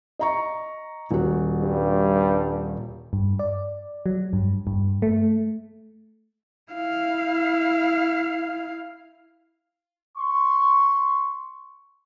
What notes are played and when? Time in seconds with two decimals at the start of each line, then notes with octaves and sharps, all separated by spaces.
0.19 D#5 A#5 C#6
1.11 D#1 F#4
1.61 G2
3.13 G2
3.39 D5
4.06 F#3
4.33 G2
4.67 G2
5.02 A3
6.74 E4 F5
10.18 C6 C#6